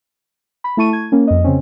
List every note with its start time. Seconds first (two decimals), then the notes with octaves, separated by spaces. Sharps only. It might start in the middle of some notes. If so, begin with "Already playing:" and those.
0.64 B5
0.77 A3 E4 A5 C#6 D#7
0.93 G#6
1.12 A#3 C#4
1.27 F2 D#5
1.44 C#3 C4 C#4